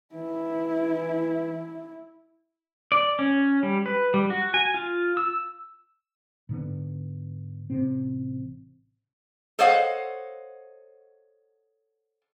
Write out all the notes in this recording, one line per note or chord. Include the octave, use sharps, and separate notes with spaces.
E3 E4
D5
C#4
G3
B4
G3
F#4
G#5
F4
E6
G#2 D3 B3
A1 C3 C4
A4 C5 C#5 D#5 F5 F#5